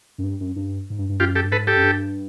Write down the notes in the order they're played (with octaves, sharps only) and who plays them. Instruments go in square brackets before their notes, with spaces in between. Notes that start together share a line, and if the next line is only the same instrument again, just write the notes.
[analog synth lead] F#2
G2
F#2
G2
G#2
G2
G2
[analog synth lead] F#2 [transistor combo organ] F4 G4
[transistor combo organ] G4 A4
[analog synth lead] G2
[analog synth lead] G#2 [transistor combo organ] A4 B4
[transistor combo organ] G4 A4
[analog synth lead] F#2
G2